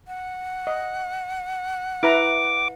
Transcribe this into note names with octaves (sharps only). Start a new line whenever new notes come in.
F#5
D#5
E4 B4 A#5 D6